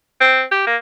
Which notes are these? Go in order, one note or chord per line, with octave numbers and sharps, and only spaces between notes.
C4
G4
A#3